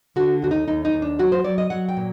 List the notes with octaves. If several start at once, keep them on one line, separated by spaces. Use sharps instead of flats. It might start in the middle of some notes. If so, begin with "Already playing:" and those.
D3 F#4
D#2 F#4
D#4
D#2 D#4
D#4
D#2
D4
F#3 F#4
C5
F#3 D5
D#5
F#3 F#5
G5
A#2